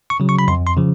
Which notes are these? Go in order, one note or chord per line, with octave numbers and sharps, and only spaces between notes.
C#6
C#3 F#3
C#6
B5
F2 C6
C6
C#3 F3